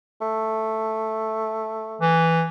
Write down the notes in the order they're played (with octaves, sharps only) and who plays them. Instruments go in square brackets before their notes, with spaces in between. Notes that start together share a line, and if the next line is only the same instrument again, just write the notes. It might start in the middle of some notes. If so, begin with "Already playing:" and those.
[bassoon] A3
[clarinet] E3